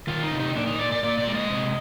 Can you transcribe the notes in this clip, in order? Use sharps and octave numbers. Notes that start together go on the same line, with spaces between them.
D#3 F4
D#4
C3
D#4
A#2 D4
D#4
A#2 D5
D5
A#2 D5
D5
G#3
D#5
C3